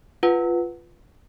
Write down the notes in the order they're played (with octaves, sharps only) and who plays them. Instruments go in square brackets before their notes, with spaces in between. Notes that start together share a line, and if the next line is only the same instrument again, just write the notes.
[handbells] F4 B4 F#5